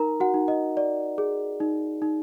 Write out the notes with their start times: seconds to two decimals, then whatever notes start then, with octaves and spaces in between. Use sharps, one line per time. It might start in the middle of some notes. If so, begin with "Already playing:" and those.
Already playing: D#4 A#4 A#5
0.20 F#4 F#5
0.34 D#4
0.48 D#5
0.77 D5
1.18 G#4
1.60 D#4
2.02 D#4